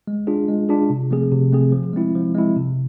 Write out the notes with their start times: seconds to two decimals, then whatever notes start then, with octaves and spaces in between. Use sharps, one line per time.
0.07 G#3
0.27 D4 F4 G#4
0.49 G#3
0.69 D4 F4 G#4
0.90 C3
1.11 F3 A3 C4 G#4
1.32 C3
1.52 F3 A3 C4 G#4
1.72 F3
1.93 G#3 C4 E4
2.15 F3
2.35 G#3 C4 E4
2.56 C3